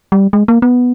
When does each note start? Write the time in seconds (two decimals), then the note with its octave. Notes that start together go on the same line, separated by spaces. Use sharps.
0.12 G3
0.33 G#3
0.48 A#3
0.62 B3